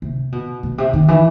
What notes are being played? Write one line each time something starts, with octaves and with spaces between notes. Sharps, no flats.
C3
B2
B2
C3
D#3
E3